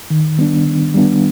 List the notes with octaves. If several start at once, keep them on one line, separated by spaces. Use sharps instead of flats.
D#3
G3 B3 D4
D#3
G3 B3 D4